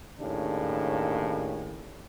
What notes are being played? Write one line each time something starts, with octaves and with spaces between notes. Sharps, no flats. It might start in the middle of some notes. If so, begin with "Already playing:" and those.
D#2 A2 C#3 D4